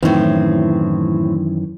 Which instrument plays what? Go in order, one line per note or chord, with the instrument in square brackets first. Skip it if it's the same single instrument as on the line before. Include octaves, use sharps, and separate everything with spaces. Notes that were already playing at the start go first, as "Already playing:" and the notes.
[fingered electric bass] F#2 D#3 E3 [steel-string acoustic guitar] A2 C4